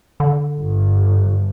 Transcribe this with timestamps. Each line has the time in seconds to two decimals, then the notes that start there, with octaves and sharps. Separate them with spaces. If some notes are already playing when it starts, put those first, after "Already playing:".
0.20 D3
0.59 G1